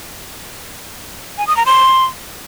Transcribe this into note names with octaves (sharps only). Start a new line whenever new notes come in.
G#5
D#6
A#5
C6